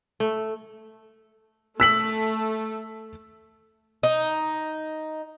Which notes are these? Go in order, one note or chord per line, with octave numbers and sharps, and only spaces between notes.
A3
A3 E6 B6 F#7
D#4